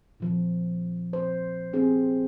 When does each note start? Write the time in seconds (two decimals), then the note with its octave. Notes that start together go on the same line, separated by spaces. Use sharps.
0.20 A#2 F3
1.13 C5
1.73 C4 G4 G#4 C5